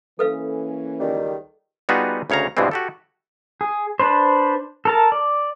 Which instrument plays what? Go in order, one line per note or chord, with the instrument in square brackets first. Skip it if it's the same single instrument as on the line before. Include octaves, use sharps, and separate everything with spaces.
[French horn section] E3 A#3 C#4 [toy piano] A4 B4 F5
[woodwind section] C#2 D#3 G3
[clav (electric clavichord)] G3 B3 D#4 F4 F#4 G#4
D2 C#3 C#5 F5 A#5
G2 B2 E3 G3 G#3 C4
F#4 G4 A4
[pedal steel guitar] G#4
D4 B4 C5
A4 A#4 A5
D5